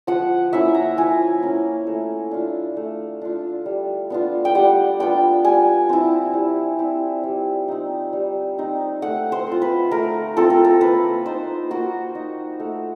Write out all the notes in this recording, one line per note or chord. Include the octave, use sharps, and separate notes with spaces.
F3 F#5
A#3 C#4 E4 E5
A#5
F3 G#5
A#3 C#4 E4
A3
D4 F4
A3
D4 F4
G3
B3 D4 F4
G5
G3 F#5
B3 D4 F4 G5
G3 G#5
C4 E4
G3
C4 E4
G3
C4 D#4
G3
C4 D#4
A3 F#5
C5
C4 F4
B4
A3 A#4
C4 F4 A4
A#4
A4
A#3 B4
D#4 C5
A#3 F#4
D#4
A3